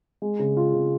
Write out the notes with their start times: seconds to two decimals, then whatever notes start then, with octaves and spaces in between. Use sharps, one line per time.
0.22 G#3
0.39 C#3
0.57 F4
0.74 C#3